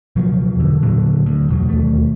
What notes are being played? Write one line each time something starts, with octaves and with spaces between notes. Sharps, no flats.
C#2 B2 F3 F#3
E2 D3
A#2 D3 F#3
D2
E2 B2 F#3
D#2 A3